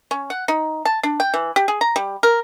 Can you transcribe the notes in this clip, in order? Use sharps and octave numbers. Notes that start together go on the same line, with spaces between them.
C#4
F#5
D#4
A5
D4
G5
E3
G4
G#4
A#5
G3
A#4